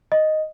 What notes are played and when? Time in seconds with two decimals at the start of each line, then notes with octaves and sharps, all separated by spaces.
0.12 D#5